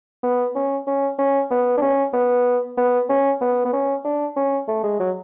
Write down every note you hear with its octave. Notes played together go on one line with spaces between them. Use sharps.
B3
C#4
C#4
C#4
B3
D4
C#4
B3
B3
C#4
B3
B3
C#4
D4
C#4
A3
G#3
F#3